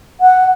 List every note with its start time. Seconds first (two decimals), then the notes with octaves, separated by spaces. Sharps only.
0.21 F#5